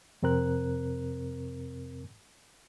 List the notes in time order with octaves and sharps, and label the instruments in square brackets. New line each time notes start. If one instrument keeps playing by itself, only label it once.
[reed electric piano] F2 C3 C4 A#4 F#6